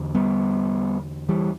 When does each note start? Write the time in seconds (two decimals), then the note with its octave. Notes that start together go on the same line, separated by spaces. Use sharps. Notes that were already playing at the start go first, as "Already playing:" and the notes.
Already playing: E2 D3
0.15 G3 B3
1.29 E3 G3